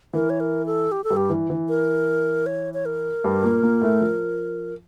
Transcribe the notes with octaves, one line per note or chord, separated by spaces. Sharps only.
E3 A#4
C#5
A#4
A4
G4
A4
G2 G3
G4
E3
E3
A#4
C#5
C#5
A#4
G2 G3
A#2 A#3
A#2 A#3
A2 A3
F3